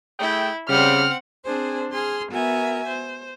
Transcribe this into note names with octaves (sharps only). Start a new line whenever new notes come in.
A3 E4 G#4 G5
C#3 G3 C4 F#5 F6
C4 D4 G#4 C5
G#4 C6 F6
B3 F#4 A#4 E5 G#5
C5